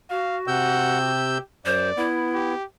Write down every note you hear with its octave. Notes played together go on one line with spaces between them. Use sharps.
F#4 F5
C3 F#5 E6 G6
G4
F#2 C5 D5
B3 E4
G4